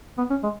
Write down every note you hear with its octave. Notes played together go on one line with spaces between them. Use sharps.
B3
C#4
G#3